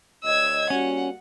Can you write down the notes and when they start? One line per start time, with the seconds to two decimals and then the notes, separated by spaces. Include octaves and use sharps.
0.24 D2 C#5 D#5 E6 G#6
0.70 G3 A#3 C#4 F#4 F#5